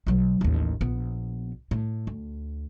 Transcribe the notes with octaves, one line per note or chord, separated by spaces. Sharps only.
B1 F#3
A1 D#2
A#1 B3
A2
D2